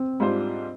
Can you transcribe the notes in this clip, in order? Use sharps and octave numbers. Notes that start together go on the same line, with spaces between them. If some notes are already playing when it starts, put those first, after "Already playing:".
Already playing: C4
G#2 G3 D4 F4 C5